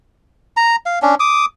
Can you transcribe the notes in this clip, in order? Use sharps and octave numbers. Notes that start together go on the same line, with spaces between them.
A#5
F5
C#4 D4
D6 D#6